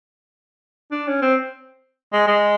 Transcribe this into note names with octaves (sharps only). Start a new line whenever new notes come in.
D4
C#4
C4
G#3
G#3